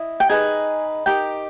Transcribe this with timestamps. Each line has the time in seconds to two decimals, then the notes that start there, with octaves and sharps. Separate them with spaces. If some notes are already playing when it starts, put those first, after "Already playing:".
Already playing: E4 D#5
0.20 G5
0.29 D#4 G#4 B4 D#5 G#5
1.06 D#4 G4 A#4 D#5 G5